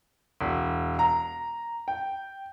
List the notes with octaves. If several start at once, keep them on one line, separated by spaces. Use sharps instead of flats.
E1
A#5
G5